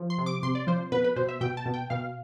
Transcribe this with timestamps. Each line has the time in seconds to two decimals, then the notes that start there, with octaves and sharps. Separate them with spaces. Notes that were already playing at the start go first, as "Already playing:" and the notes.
Already playing: F3
0.10 C6
0.18 C3
0.26 D6
0.43 C3 C6
0.55 D5
0.67 F3 C5
0.92 B2 B4
1.04 B4
1.16 B2 C5
1.28 E5
1.41 B2 G5
1.57 A5
1.66 B2
1.74 G5
1.90 B2 F5